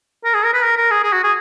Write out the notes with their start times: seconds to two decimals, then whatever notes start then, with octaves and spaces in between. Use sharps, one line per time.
0.24 A#4
0.34 G#4
0.44 A#4
0.53 B4
0.64 A#4
0.77 A#4
0.91 G#4
1.03 G#4
1.13 F#4
1.23 G#4